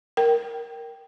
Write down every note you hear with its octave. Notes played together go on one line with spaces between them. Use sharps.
A#4 G5